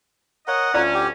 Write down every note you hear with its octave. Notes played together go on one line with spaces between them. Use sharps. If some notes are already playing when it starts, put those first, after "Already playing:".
A#4 C#5 D#5 F#5
D2 C#4 F4 D5 A#5
G4